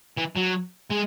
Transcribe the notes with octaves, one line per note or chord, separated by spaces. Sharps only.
E3
F#3
G#3